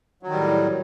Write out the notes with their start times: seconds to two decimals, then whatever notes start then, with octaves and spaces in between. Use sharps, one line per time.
0.23 F#3
0.27 D#3
0.32 G3
0.36 A2